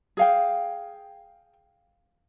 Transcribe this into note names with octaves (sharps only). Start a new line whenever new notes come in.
G#4 F5 G5